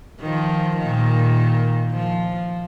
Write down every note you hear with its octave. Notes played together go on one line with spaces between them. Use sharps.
D#3 F3
A#2 D#3
F3